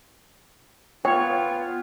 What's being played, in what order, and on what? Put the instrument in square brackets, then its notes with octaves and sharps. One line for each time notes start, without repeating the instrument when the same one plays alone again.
[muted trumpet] B3 [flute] F4 [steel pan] C#5 [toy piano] G5